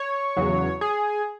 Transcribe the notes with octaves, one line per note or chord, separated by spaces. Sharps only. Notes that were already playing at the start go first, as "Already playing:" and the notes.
Already playing: C#5
E2 C#3 F#3
G#4